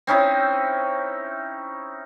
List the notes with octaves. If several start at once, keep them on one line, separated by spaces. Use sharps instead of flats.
C4 C#4 D#4 E4